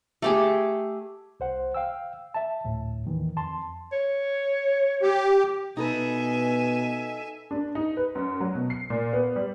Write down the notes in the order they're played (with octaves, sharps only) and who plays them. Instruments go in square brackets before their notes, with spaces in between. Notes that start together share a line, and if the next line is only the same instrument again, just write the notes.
[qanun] A3 G4 G#4
[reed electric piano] C2 C5 F#5
F5 G5 E6
E5 A5
D2 A2
D#2 D#3 E3
F2 A5 C6
[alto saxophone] C#5
[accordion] G4
[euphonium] B2 [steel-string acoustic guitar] D#4 A4 B4 [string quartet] E5 G#5
[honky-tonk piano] D4
D#4
B4
F#2
F#3
B2
C7
A#2
B3
G3